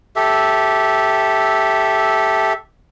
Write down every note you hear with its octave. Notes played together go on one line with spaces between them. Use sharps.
G4 A4 E5